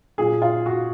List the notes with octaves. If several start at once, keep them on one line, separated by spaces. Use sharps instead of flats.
A#2 F#3 G#4
F4
F#4